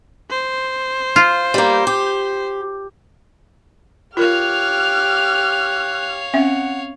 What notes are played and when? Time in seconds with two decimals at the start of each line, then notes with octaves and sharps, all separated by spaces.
0.30 C5
1.16 F4
1.54 G3 A#3
1.87 G4
4.17 F4 G4 A#4 C#5 F5 F6 F#6
6.34 C4 C#4 E5 F#5